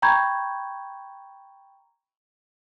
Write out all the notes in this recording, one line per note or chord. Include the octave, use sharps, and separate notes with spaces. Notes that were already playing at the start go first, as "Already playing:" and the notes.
G5 A#5 B5 C#6 G6 G#6